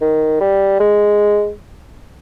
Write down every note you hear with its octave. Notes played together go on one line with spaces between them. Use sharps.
D#3
G3
G#3